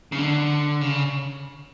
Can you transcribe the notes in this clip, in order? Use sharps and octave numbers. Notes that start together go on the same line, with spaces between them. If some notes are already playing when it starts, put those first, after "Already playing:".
C#3
D3
C#3